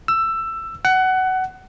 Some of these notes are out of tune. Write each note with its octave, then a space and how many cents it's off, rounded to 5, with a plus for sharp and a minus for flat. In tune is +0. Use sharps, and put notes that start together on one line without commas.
E6 +15
F#5 +20